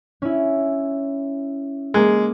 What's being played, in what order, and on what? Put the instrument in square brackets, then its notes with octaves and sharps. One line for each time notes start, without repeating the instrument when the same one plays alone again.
[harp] C#4 E4
[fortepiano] G#3 [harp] A#3 G#6 D7